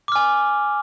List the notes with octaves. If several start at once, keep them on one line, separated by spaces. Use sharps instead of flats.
G#5 D6 F6